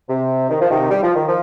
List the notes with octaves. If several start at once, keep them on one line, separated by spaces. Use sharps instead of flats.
C3
D#3
F3
C3 D#3
G3
F3
D#3
F3